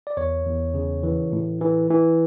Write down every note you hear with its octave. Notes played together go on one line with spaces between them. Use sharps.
D5
E2 C#5
E2
C#3
E3
A2
E3
E3